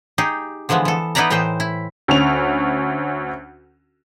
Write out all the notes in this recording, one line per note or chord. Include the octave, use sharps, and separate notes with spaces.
D#4 G4 G#4
D3 E3 F3 G#3 B3
E3 A4
B3 D#4 E4 B4 D5 A#5
A2 E3 D#4 C5 G5
E4
D2 C#4 F7